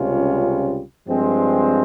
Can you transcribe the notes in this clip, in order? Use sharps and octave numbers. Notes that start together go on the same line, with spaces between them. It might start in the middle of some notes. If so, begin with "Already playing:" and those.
Already playing: C#2 C3 G3 C#4 F4
G2 F3 G#3 C4